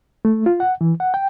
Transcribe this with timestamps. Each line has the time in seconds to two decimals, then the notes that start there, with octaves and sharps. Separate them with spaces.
0.25 A3
0.46 F4
0.60 F#5
0.81 E3
1.00 F#5
1.14 G5